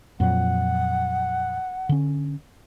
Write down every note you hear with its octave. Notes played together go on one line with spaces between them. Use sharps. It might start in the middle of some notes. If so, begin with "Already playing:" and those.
F2 A#2 F#3 F#5
D3 C#4